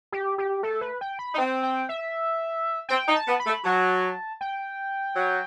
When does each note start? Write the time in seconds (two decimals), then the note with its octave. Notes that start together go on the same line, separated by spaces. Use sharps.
0.12 G4
0.38 G4
0.63 A3 A4
0.81 B4
1.01 G5
1.19 B5
1.34 D#4
1.38 C4 G5
1.63 G5
1.89 E5
2.89 C4 G5
3.08 D#4
3.15 A5
3.27 B3
3.40 B5
3.46 A3
3.64 F#3 A5
4.41 G5
5.15 F#3